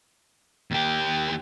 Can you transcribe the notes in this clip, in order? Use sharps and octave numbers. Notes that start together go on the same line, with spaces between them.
D#2 G4